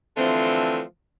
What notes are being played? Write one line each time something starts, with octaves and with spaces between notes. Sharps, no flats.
D3 E3 F3 A3 C4